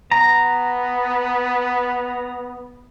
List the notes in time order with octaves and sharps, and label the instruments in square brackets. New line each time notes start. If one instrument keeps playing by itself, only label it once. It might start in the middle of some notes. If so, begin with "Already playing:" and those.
[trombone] B3 [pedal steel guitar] A#5